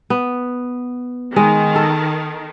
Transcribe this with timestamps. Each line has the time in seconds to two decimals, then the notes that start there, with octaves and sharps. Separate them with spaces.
0.10 B3
1.36 D#3 G#3
1.76 A4